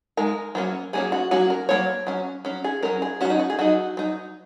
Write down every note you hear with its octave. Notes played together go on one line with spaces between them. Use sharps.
G#3 D#4 A#4
F#3 A#3 C#4
F#3 A#3 C#4 G#4
F#4
F#3 A#3 C#4 F#4
A#4
F#3 A#3 C#5
F#3 C#4
F#3 C#4
G#4
F#3 C#4 A#4
G#4
F#3 C#4 F#4
D#4
F#4
G#4
F#3 D#4 F#4
F#3 D#4